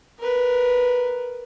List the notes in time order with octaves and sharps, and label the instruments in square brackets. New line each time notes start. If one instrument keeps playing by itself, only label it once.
[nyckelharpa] A#4 B4